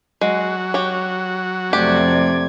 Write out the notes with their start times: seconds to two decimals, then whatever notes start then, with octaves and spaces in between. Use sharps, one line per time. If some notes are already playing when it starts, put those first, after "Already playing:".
0.21 F#3 G#3 F#4
0.74 G4 C#5
1.73 F2 C3 A3 G4 D5 G#6